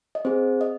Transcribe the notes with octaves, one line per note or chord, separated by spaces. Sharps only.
D#5
C4 G#4 C5
D#5